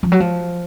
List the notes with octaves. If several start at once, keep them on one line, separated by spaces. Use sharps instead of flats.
F3
F#3
F3